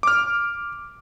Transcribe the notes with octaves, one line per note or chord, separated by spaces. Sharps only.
D6 F6